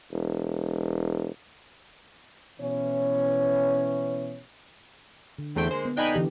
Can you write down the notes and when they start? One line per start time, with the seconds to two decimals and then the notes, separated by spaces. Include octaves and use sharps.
0.12 E1
2.60 B2 E3 C#4 C#5
5.39 D3
5.56 E2 A3 C4 G5
5.71 G#3 A#3 C5
5.85 B3
5.97 F2 D4 D#4 G5 G#5 B5
6.14 D3 E3 G4